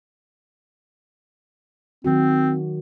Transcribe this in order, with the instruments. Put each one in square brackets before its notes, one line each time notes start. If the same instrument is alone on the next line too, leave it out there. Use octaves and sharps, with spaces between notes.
[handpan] D#3 F#3 F#4 [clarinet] C4